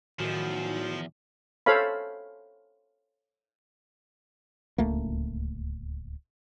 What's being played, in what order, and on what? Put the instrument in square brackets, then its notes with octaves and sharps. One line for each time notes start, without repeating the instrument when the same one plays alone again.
[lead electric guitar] E2 [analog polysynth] A2 D#3 [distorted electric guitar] F3 [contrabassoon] F#3
[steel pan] A4 C5 C#5 F5 B5
[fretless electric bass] D1 C#2 A3 A#3